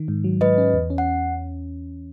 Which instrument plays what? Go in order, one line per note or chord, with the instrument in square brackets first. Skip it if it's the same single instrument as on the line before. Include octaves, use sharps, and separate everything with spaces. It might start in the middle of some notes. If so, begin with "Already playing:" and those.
Already playing: [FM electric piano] D#3
G#2
F#3
[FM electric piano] G#2 [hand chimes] B4 D#5
[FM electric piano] C#4
E2
C#4
[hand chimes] F#5